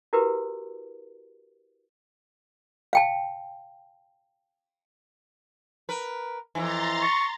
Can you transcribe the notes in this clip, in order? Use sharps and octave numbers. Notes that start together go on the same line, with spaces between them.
E4 F#4 G4 A#4 B4
F5 G5 A5
A#4 B4
F2 G#2 E3 A#5 C6 A6
C#6